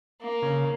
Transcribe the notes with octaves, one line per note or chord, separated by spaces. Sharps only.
A#3
C#3